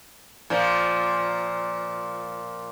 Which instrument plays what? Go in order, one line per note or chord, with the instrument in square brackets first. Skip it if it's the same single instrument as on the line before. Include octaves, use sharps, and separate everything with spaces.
[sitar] A#2 F3